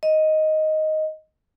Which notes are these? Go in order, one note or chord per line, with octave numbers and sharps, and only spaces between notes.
D#5